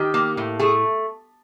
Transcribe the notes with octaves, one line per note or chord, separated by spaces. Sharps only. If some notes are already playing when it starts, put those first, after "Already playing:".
Already playing: D#3 G4
A#3
A2
A3 G#4